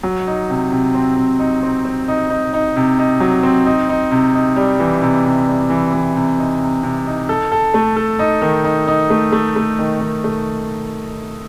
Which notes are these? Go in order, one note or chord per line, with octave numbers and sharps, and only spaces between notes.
F#3
D#4
C3
C3
C4
C3
D#4
C4
C4
D#4
D#4
D#4
C3
D#4
F#3
C4
D#4
D#4
C3
D#4
G3
E3
C3
C3
G3
E3
E3
C3
D#4
C3
C3
D#4
A4
A4
A3
A4
D#4
D#3
D#4
D#4
A3
A3
A3
D#3
D#3
A3